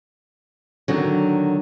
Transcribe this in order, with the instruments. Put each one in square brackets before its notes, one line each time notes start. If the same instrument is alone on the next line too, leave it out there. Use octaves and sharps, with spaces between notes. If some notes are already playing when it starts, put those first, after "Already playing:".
[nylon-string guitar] D3 D#3 F#3